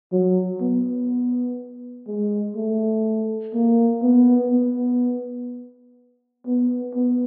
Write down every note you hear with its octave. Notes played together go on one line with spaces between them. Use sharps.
F#3
B3
G#3
A3
A#3
B3
B3
B3
B3